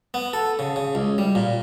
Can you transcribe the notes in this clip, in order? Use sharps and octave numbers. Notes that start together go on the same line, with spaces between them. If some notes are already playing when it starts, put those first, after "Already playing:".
B3
A4
C#3
C#3
C#2
G3
A#2